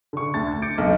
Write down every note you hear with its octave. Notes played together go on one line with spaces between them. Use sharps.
D3 C#6
D2 D4 A6
D6 G6 A6 C#7 D7
B1 F2 D3